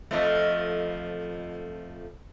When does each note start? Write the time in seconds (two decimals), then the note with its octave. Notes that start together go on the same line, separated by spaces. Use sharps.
0.11 F2 F3 A3